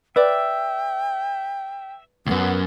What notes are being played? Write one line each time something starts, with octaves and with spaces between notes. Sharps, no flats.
B4 D5 E5 G5
C#2 F#2 B3